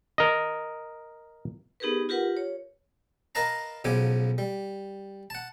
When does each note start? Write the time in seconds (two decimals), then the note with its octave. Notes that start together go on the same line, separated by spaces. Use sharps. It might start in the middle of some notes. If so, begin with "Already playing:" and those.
0.18 A#4 D#5
1.80 B3 D#4 G4 G#4 A#4 B4
2.09 F4 G4 A#4 B4 F#5
2.37 C#5
3.35 A#4 B4 D#5 F5 A5 A#5
3.84 B1 C#3 F3 B3 G#5 D6
4.38 G3
5.30 F#5 A5